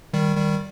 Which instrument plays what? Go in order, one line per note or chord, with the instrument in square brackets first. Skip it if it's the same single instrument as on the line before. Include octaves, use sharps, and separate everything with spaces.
[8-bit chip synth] D#3 G3
D#3 G3